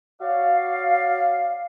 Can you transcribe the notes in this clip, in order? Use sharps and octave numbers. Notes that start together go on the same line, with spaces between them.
F#4 C#5 D5 F5